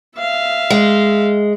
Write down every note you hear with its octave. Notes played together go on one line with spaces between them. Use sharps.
E5 F5
G#3